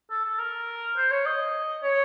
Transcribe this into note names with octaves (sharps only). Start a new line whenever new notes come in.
A4
A4
A#4
C5
C#5
D#5
C#5